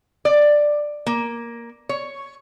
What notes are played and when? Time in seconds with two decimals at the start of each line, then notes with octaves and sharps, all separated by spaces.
0.25 D5
1.06 A#3
1.89 C#5